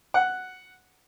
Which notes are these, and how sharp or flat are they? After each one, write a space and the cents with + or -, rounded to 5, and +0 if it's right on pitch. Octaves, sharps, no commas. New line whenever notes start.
F#5 +0